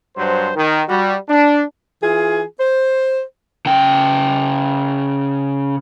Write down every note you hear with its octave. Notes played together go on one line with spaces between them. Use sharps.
G2 F#3 C5
D#3
G3 F#4
D4
E3 F4 G#4
C5
C#3 G5